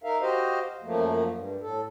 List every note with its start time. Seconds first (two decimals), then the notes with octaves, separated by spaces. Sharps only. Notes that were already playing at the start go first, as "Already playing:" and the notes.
0.04 D#4 A#4 E5 F5
0.21 F#4 G4 C5 D#5 F5
0.83 F#2 F3 A3 A#3
1.33 G2
1.61 A2 A4